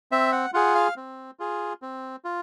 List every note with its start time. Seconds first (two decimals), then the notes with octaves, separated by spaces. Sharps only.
0.12 C4 E5
0.32 F#5
0.54 F4 G#4 F#5
0.75 F5
0.97 C4
1.39 F4 G#4
1.82 C4
2.25 F4